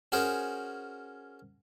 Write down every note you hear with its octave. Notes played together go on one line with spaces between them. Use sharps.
C#4 F#4 G#4 A#4 C5